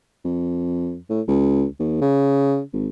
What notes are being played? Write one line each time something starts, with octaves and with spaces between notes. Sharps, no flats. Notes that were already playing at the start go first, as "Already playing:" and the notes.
F2
A2
C#2
D#2
C#3
G#1